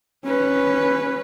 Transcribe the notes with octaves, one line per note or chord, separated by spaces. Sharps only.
C#4 B4